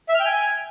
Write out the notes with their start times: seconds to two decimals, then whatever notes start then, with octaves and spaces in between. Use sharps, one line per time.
0.09 E5
0.14 F6
0.20 G5
0.26 G#5